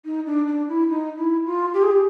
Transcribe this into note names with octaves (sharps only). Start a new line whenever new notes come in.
D#4
D4
D4
E4
D#4
E4
F4
G4
G#4
G4